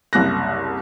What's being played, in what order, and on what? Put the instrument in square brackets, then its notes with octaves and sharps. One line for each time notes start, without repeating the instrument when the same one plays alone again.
[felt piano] F#1 C2 F#6 A#6